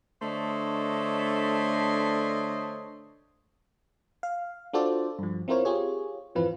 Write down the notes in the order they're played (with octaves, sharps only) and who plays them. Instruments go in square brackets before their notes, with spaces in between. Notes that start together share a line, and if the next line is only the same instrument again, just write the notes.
[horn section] D3 A3 D4 C5 C#5 D#5
[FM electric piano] F5
D4 F4 F#4 A4 C5 D5
G2 F3
C4 E4 F4 A#4 C5 C#5
F4 G4 G#4 C#5
G#1 F2 E3 C4 F4 B4